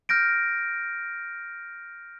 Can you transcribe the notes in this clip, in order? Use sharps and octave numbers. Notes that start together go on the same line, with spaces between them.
F6 G6 A#6 D7